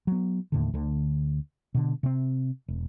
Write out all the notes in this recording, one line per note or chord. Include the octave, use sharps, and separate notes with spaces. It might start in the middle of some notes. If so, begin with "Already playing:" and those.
F#3 B3
D#2 A2 D3
D2 D3
B2 D3
C3 C4
E1